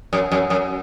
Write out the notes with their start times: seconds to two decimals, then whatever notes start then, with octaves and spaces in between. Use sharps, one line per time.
0.13 F#2
0.32 F#2
0.50 F#2